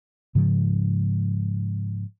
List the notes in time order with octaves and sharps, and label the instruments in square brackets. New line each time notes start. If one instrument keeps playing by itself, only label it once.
[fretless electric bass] G#2 C#3 F3 G#3